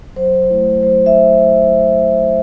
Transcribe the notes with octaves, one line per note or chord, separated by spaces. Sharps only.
F#3 C5
A3 E4
F#3 C5
E5